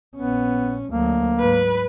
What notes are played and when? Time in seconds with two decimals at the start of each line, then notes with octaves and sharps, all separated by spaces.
0.15 A#1 B3 C#4
0.90 D2 F#3 A#3
1.39 G#2 F#3 B4